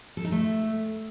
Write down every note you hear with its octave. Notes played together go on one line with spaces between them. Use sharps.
A4
D#4
A3